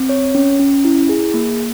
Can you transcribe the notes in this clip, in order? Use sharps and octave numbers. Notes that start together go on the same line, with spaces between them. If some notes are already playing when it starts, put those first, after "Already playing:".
Already playing: C4
C#5
C#4
C#4
E4
G#4
A#3